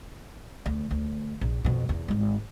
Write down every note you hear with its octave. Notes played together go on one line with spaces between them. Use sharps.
D2
D2
A#1
F2 B2
E2
G#1 G#3